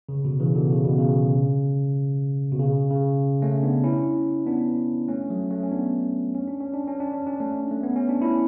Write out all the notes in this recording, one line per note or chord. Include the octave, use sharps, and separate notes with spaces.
C#3
B2 D3
C#3 E3
B2 D3
C#3
B2
C#3
B2
C#3
C#3
A3 C#4
B3 D4
C#4 E4
B3 D4
A3 C#4
F#3 A3
A3 C#4
C#4
B3 D4
C#4
D4
C#4
D4
C#4
D4
C#4
D4
A3 C#4
A3
B3
C#4
D4
C#4 E4